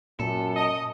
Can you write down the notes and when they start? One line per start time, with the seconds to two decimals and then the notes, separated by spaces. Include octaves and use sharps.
0.20 F#2 A#2 A4
0.56 D#5